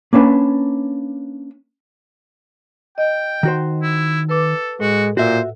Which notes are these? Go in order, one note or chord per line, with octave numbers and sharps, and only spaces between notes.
A#3 C#4 D4 B4
D#5 G5
D#3 F#4 C5
E4
A4 B4 D6
A2 G#3 F#4
A#2 F#4 C5 E5